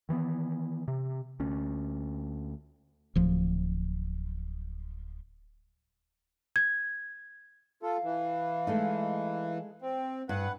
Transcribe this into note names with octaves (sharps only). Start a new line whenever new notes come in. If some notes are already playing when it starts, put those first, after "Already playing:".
D#3 E3 G#3 B3
C3
D2 C#4
D1 F3
G#6
F4 A4 F5
E3
G#3 A3 D#4
C4
G2 B4 F#5